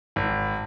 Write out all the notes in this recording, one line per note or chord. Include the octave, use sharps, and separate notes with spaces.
G#1